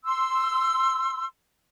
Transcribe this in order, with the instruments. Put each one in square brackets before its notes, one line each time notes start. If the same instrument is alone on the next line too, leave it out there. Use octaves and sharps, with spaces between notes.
[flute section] C6 E6